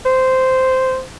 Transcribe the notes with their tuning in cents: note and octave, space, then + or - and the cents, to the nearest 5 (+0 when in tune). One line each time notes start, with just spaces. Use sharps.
C5 -10